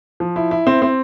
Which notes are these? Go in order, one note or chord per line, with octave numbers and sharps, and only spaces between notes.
F3
E4
E4
C4
C4